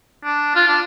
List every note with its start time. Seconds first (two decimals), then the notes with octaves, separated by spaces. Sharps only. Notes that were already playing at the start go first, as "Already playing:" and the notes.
0.25 D4
0.55 F4
0.68 D4